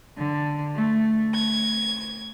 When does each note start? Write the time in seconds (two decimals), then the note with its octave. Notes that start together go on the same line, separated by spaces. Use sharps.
0.15 D3
0.74 A3
1.34 G#6